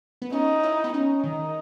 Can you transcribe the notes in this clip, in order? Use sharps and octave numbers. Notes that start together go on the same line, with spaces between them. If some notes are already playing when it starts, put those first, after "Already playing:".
B3
C#4 D#4
E4
B3
C#4 D#4
D#3 D#4